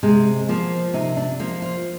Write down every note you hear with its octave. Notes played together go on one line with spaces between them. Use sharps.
C3 G#3
F3 A#3
C3 D#4
D4
F3 A#3
F4